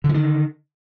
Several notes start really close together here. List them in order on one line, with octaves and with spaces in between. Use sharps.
D3 F3 D#3